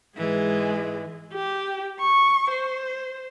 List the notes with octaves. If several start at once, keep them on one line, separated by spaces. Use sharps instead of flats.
G#2 E3 G#3 G#4
G4
C#6
C5